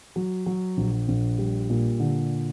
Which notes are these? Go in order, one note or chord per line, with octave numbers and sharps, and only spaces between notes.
F#3
F#3
A#1
A#1
G3
A#2
D3